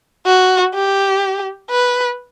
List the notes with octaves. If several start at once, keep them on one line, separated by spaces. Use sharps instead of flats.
F#4
G4
B4